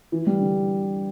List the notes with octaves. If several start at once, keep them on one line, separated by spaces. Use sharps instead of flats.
E3
G3
D3